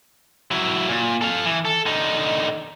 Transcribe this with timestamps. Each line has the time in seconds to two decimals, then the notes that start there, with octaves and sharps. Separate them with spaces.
0.51 F#3 E4
0.89 A#2
1.22 A4 F5
1.45 E3
1.65 A4
1.86 D3 D#4